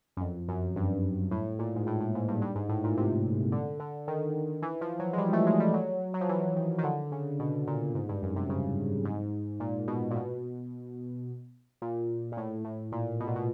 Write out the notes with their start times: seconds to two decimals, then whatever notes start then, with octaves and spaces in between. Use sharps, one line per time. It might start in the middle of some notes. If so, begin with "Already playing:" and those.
0.17 F#2
0.21 F2
0.48 F#2
0.76 G2
1.31 A2
1.59 A#2
1.76 G#2
1.87 A2
2.00 A2
2.15 G#2
2.28 G2
2.41 G2
2.55 G#2
2.69 A2
2.84 A#2
2.97 C3
3.52 D3
3.80 D3
4.08 D#3
4.62 E3
4.81 F3
4.99 F#3
5.13 G#3
5.18 G3
5.33 A3
5.46 G#3
5.60 G3
5.74 F#3
6.14 F#3
6.21 F3
6.29 E3
6.56 D#3
6.78 D#3
6.84 D3
7.12 C#3
7.39 B2
7.67 A#2
7.95 G#2
8.09 G2
8.23 F#2
8.36 C3
8.49 C#3
9.05 G#2
9.60 A#2
9.87 B2
10.11 A#2
10.16 B2
11.82 A#2
12.32 A#2
12.37 A2
12.64 A2
12.92 A#2
13.20 B2
13.27 A#2
13.36 B2